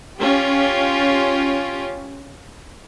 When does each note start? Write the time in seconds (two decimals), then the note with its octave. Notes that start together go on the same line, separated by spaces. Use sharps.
0.19 C#4 F4 G4